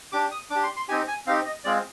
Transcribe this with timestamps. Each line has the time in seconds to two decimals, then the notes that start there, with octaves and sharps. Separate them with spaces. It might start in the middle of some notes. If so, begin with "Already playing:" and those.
0.12 D4 G4 D6
0.32 D#6
0.50 D4 D6
0.55 G4
0.63 C6
0.76 C6
0.88 C4 D#4 G4 G#5
1.08 G#5
1.26 C4 D#4 G4 F5
1.46 D#5
1.64 G#3 C4 F4 D5